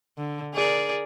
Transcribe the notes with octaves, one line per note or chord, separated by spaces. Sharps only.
D3
G#4 A#4 D5